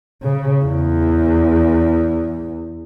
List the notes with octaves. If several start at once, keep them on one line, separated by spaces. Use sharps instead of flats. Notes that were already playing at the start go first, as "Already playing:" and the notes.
C#3
E2